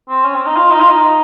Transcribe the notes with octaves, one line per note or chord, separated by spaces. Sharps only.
C4
C#4
C4
D#4
F4
D#4
F4
D#4